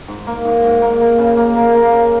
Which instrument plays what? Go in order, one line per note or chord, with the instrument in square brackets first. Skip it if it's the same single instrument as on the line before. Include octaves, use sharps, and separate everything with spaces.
[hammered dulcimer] G#2
A#3
G#2
G#2
A#3
A#3
C#3
A#3
A#3
A#3
C#3